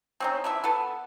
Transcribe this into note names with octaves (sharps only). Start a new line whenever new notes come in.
C4 C#4 D#4
D3 E3 E5
B3 A4 B4